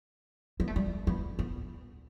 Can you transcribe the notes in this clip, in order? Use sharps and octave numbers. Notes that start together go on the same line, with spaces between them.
B3
A3
G3
B3
B3